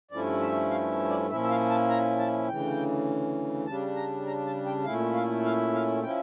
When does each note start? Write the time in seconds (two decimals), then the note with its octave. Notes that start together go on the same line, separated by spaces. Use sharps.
0.11 G2 F3 A3 C#4 E4 D5
0.41 E5
0.71 F5
1.10 D5
1.30 A#2 F3 C#4 E4 E5
1.44 E5
1.50 F5
1.70 A5
1.89 A#5
2.19 A5
2.48 D2 C#3 E3 G5
3.67 C#3 G3 D4 A5
3.96 A#5
4.26 A#5
4.46 A5
4.66 G5
4.85 A#2 A3 C#4 E4 F5
5.14 F5
5.44 F5
5.74 F5
6.03 F3 C#4 E4 G5